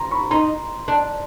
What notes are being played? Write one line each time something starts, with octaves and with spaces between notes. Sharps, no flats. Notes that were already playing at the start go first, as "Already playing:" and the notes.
Already playing: A#5 C6
B5 C#6
D#4 A#5 C6
D4